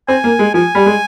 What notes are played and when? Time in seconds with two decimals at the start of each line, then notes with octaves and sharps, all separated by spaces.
0.08 C4 G#5
0.24 A#3
0.39 G#3
0.54 F3 G#5
0.75 G3
0.86 G#3